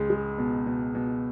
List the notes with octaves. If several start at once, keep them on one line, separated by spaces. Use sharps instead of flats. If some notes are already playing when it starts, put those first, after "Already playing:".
Already playing: C#2 G#3
G#3
B2
B2
B2